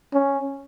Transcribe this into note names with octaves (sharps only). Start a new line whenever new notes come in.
C#4